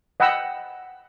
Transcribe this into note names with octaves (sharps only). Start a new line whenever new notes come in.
D#5 F#5 G5 B5 E6